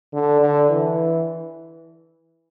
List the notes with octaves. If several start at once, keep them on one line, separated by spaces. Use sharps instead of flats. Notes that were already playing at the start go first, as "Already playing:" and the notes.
D3
D3
E3